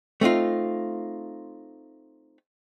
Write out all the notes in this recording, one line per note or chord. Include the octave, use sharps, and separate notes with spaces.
A3 C4 D#4 F4